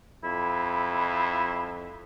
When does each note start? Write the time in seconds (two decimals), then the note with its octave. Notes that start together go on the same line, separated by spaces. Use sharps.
0.24 F2 E4